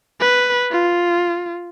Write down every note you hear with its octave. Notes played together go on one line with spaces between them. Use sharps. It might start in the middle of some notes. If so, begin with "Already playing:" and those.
B4
F4